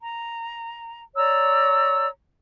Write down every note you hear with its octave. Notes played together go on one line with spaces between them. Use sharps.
A#5
C#5 D5 A#5 E6